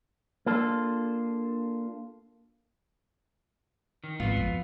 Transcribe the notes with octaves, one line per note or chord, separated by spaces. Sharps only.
A#3 D4 F4 A4
D#3
G#1 B3 F4
F2